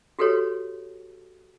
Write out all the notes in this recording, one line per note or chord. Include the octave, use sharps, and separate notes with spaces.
F#4 G4 A4 B4 C#5